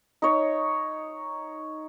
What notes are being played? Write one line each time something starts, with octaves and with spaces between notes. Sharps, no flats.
D#4 C#5